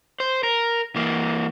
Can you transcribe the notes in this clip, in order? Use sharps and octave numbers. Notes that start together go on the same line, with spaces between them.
C5
A#4
E3 A#3